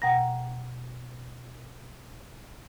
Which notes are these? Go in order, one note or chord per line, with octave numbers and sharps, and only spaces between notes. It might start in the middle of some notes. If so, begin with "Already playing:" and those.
B2 F#5 G5 A#5 A#6